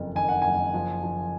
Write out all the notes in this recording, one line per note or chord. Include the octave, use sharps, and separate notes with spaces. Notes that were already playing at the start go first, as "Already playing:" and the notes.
Already playing: F#1 F2
D#3 G#5
F#5
F#1 G#5
F3
F3